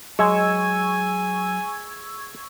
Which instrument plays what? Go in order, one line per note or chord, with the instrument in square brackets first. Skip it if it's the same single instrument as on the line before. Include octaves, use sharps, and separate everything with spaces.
[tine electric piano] F#3 [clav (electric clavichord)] G#3 [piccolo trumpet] G#5 [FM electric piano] C#6 E6 G#6